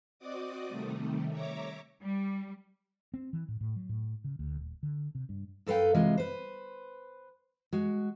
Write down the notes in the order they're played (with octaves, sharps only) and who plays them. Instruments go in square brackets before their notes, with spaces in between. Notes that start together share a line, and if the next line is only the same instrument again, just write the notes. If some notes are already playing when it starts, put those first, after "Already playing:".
[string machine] C4 F#4 D5 D#5 D6 D#6
C3 D#3 G3 A3
C#5 E5 A#5 D6
[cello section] G3
[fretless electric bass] C4
E3
A2
A2
F#3
A2
C#3
D2
D#1
D3
C3
G2
[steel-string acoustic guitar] F#2 A4 B4 F5 G5
C3 E3 G#3 F4
B4 C5
G#3 F#4